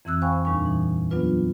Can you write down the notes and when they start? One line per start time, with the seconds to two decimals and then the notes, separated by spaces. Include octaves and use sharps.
0.05 F2 E3 C4 E6 F#6
0.22 C5 F5 G5 G#5 B5 C#6
0.45 D#2 A#2 G3 D4 G#5 C#6
0.65 E3
1.11 F#3 B3 D4 F4 B4